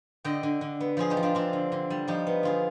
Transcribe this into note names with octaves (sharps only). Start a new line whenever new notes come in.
D3 D#5 G5
D3
D3
B3
F3 F4 G#4
D#4 G4
F3
D4 F4
C4 D4 F4
D3
D3
G3
F3 D#4 G4
B3
D3 F4 G#4